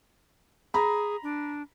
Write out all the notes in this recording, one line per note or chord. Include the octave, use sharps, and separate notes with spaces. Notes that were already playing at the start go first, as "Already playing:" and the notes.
G#4 A#5 B5
D4